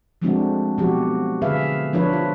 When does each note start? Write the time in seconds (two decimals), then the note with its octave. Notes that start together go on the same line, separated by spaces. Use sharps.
0.22 F3 G#3 A3 C4 D4 F#4
0.78 B2 F3 F#3 F#4 G4
1.42 D3 G#4 B4 E5 F5
1.93 F3 D4 F4 B4 C#5
2.13 F4